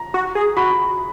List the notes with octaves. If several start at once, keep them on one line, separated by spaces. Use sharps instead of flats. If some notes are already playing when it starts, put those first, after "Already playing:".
Already playing: A#5
F#4
G#4
F#4 B5